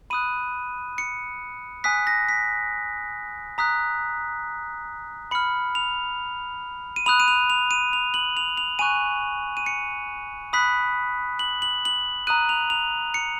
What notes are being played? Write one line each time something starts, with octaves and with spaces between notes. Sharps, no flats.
B5 D#6 F#6 D#7
C#7
G#5 D#6 F#6 B6
A#6
B6
A#5 D#6 F#6 B6
B5 F6 C#7
F7
D#7
B5 D#6 F#6 F7
D#7
F7
F7
D#7
F7
F#7
F7
F7
G#5 C#6 F#6 D#7
D#7
C#7
B5 D#6 F#6 B6
F#7
F#7
F#7
A#5 D#6 F#6 D#7
F7
F7
C#7